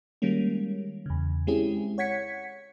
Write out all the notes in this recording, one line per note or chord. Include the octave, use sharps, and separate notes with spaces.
D#3 G3 G#3 A#3 C#4
E2 C#3
G#3 C4 C#4 E4 G4 G#4
C#5 F#5 G#6 B6 C#7